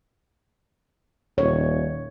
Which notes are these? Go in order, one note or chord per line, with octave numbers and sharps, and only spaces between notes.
D#1 C#5